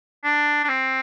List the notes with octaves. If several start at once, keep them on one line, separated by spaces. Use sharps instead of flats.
D4
D4
C4